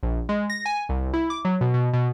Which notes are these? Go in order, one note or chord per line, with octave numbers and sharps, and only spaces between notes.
A#1
G#3
A#6
G#5
C2
E4
D6
F#3
B2
B2
B2